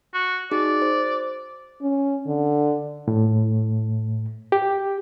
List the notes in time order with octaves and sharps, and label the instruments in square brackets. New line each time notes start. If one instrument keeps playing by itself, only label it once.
[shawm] F#4
[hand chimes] D#4 F#4 G#4 [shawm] D5
[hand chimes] C5
[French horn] C#4
D3
[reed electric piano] A2
G4